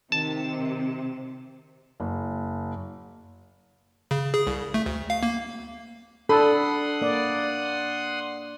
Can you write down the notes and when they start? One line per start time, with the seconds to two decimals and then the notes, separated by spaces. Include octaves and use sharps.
0.12 C3 D#3 A5
2.00 F#1
4.11 C#3
4.34 G#4
4.47 C2
4.74 A3
4.86 D2
5.10 F5
5.23 A#3
6.29 D4 A4 F#5 B5 C6 D#6
7.02 A#3 D5